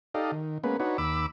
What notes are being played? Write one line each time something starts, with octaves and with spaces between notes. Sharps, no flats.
D#4 G4 A4 D5 D#5 F5
D#3
G#3 A#3 B3 C#4 B4
D4 D#4 F#4 B4 C#5
D#2 B5 D6 E6